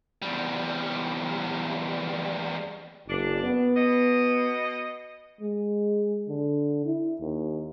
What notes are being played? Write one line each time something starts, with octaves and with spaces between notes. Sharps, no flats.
E2 G3
F#1 D4
B3
B2 D#5
G#3
D3
E4
D#2